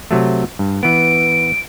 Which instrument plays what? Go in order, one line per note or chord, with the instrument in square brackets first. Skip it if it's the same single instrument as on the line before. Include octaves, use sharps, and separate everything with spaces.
[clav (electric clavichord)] C3 F#3 A3
G2
[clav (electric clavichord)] E3 B3 [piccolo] D7